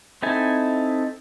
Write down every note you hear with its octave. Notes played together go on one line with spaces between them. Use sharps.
C4 D#4 E4 A4 G#5